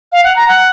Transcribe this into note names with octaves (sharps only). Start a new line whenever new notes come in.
F5
F#5
A#5
F#5